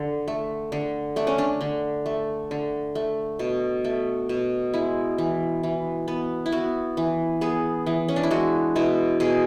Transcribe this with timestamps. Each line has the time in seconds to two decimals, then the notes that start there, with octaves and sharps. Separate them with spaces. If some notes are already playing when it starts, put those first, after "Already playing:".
Already playing: D3
0.28 A3
0.72 D3
1.16 A3 D4
1.27 C#4
1.38 D4
1.61 D3
2.06 A3
2.51 D3
2.95 A3
3.39 B2
3.85 A3
4.29 B2
4.74 G#3 E4
5.18 E3
5.63 E3
6.08 B3
6.46 E4
6.52 B3 F#4
6.97 E3
7.41 B3 G#4
7.86 E3
8.08 C#4
8.16 D4
8.23 E4
8.31 G#3 F#4
8.76 B2 E4
9.20 B2 G#4